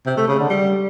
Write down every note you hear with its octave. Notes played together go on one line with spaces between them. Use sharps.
C3
A3
C#3
D3
G3